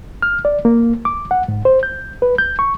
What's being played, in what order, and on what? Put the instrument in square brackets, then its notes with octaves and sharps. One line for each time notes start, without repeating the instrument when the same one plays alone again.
[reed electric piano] F6
D5
A#3
D6
F#5
G#2
C5
G6
B4
G6
C#6